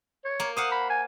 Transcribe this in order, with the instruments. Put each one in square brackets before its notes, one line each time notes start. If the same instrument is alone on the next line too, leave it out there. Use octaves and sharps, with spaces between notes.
[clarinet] C#5
[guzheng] A#3
[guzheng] C5 F5 F#5 [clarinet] D#6
[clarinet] B5
G#5